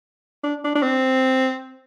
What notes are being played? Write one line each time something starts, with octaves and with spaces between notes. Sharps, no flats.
D4
D4
D4
C4